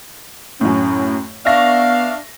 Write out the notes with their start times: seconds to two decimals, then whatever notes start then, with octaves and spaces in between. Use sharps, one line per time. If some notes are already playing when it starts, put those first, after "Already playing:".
0.61 F#2 A2 C#4
1.46 B3 D4 E5 F5 C#6 A#6